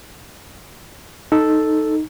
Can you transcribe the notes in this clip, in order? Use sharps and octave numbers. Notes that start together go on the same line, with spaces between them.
D#4 A4